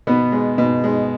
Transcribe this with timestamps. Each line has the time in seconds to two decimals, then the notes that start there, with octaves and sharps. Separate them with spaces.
0.07 B2 B3
0.32 G#3
0.58 B2
0.84 G#3